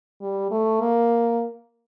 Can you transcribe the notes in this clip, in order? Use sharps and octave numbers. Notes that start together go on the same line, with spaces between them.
G3
A3
A#3